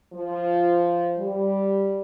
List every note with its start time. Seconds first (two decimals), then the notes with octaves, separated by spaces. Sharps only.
0.14 F3
1.19 G3